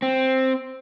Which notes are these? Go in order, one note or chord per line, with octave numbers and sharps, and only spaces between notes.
C4